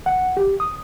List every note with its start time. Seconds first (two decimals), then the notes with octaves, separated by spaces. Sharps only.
0.06 F#5
0.37 G4
0.60 D#6